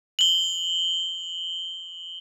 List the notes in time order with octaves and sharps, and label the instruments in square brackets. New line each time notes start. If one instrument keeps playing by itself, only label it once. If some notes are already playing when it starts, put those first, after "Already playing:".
[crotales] F#7 G7